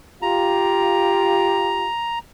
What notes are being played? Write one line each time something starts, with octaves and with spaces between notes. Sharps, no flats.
F4 G4 A#5